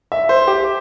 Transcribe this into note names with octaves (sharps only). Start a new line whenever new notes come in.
E5
C5
G4